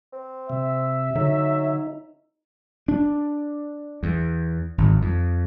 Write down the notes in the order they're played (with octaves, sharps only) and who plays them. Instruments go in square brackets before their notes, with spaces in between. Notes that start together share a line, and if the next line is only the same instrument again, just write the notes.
[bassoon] C4
[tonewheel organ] C3 [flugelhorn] E5
[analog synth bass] D3 [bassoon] F#3 [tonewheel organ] D#4
[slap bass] D4
E2
G#1
F2